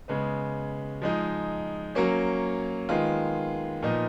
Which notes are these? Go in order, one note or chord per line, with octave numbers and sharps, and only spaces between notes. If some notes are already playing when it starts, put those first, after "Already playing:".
C#3 G#3 B3
F3 G#3 D#4
F#3 A#3 C#4
D#3 G#3 B3 F4
A#2 F3 B3 D#4